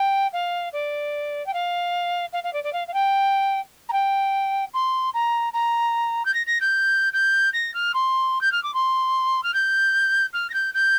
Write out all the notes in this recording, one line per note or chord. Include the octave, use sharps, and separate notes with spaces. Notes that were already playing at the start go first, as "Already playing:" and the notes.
Already playing: G5
F5
D5
G5
F5
F5
F5
D5
D5
F5
F5
G5
A#5
G5
C6
A#5
A#5
G6
A#6
A#6
G6
G6
A#6
F6
C6
G6
F6
D6
C6
F6
G6
F6
A#6
G6
G6